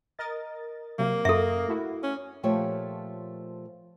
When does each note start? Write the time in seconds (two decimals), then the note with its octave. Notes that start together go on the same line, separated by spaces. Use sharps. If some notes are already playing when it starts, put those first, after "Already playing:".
0.19 A#4 D#5 A6
0.99 C3 F#3 A#3
1.25 F#2 A4 E5
1.68 A3 E4 F#4
2.03 C#4
2.43 A#2 F3 A3 G4 C#5 G5